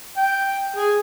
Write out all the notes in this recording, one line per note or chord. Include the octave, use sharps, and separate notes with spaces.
G5
G#4